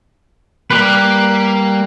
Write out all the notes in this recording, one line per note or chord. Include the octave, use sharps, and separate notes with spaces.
G3 A#3 G4 B4